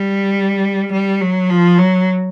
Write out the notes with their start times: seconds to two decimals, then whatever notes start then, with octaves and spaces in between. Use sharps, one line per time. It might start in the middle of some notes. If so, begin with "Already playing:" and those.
Already playing: G3
0.92 G3
1.21 F#3
1.49 F3
1.78 F#3